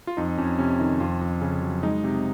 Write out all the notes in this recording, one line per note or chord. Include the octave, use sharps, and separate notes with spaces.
F4
F2 D#4
F2 C#4
C3 C#4
D#3 D#4
F2 F4
F2
C#3 C#4
F#3
G#3 D#4
C3